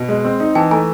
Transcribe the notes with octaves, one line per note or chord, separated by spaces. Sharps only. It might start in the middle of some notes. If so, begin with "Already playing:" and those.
Already playing: B2
G#3
C4
D#4
E3 G5 A5
A3 G#5 A#5